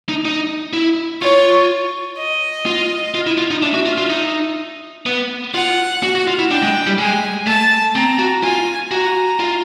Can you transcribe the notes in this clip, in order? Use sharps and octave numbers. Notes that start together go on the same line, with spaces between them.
D#4
D#4
E4
F4 C#5
D#5
F4
F4
E4
F4
D#4
D4 E5
F#4
F4
F4
D#4
B3
F4 F#5
F#4
F#4
F4
E4
D4 G5
G#3
G3
G#3 G#5
A3 A5
C4 A#5
F#4
F4 G#5
F#4 A#5
F4